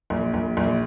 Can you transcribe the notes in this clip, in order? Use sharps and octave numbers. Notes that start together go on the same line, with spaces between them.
A#1
A#1
A#1